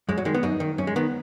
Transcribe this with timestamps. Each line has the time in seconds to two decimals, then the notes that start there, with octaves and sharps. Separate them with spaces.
0.09 F#2 G#3
0.18 F#3
0.25 D#3 G#3
0.34 B3
0.43 F#2 D#4
0.60 D#3
0.78 F#2 C#4
0.87 G#3
0.96 D#3 B3